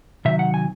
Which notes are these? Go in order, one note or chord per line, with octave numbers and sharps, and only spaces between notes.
C3 D#3 F#3 E5
F#5
G#5